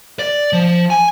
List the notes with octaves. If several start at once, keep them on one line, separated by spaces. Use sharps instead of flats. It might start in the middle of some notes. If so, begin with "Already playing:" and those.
D5
F3
G#5